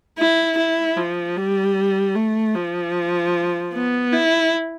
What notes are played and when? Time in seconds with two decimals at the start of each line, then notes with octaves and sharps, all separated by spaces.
0.18 E4
0.58 E4
0.97 F3
1.37 G3
2.15 A3
2.55 F3
3.73 B3
4.12 E4